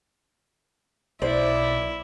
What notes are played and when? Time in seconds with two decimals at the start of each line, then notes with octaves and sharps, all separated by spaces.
1.22 B1 E4 C5 D5